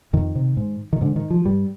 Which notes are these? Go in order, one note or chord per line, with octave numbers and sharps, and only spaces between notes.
F2 D#3
C3
G#2
D#3
G#2 D3
D#3
F3
G2 G3